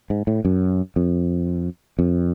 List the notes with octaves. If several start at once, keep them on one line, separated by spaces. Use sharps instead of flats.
G#2
A2
F#2
F2
F2